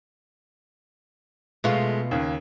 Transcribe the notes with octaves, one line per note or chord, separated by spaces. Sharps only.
B2 G#3 A3 F4
D#2 C#3